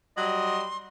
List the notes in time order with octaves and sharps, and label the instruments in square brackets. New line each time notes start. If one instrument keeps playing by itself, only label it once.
[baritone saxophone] F#3 [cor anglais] G3 [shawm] D#5 [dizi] C6